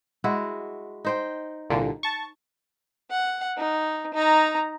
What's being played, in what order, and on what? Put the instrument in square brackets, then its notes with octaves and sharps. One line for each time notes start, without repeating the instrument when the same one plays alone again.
[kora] G#3 E4 F#4
D#4 C5 G5
[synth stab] C2 A#2 D3
A5 C#6
[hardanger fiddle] F#5
D#4
D#4 A#5